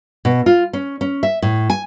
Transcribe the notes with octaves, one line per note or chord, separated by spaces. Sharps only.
B2
F4
C#4
C#4
E5
A2
G#5